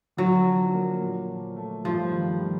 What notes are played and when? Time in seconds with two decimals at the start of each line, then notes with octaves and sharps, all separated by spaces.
0.17 D3 F#3
0.45 F3
0.74 A#3
1.01 A#2
1.28 F3
1.56 A3
1.84 G2 F3
2.12 D#3
2.40 G3